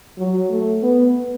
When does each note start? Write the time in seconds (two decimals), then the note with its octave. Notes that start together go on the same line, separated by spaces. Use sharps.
0.18 F#3
0.50 A3
0.83 B3